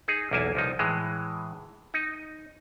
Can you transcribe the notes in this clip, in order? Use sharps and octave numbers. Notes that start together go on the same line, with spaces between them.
D#4 G#4
B1 E2 A#3 E4 G#5 A5
C2 F3 D#4
A2 E3 G#3
D#4